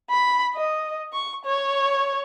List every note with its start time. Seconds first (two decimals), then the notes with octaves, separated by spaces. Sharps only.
0.10 B5
0.54 D#5
1.13 C#6
1.45 C#5